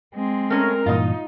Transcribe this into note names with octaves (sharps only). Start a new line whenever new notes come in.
G#3 C4
A3 C#4 A#4
G2 A#2 E3 D#4 F4 D#5